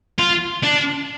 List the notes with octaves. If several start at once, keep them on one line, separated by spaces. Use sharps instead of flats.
F4
D4